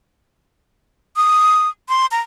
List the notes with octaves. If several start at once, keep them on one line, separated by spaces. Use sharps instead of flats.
D#6
C6
A#5